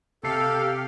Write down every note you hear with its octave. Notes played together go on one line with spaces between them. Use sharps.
C3 G4 A4 F5 C7